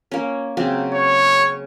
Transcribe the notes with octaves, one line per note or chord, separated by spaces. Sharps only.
A#3 C#4
C#3 F#3 C4
C#5